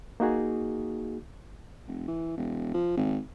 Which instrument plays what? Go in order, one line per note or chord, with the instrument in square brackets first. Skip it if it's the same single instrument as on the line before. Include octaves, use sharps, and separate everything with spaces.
[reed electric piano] A#3 D#4 F#4 G#4
[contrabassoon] F1
E3
E1
F3
G#1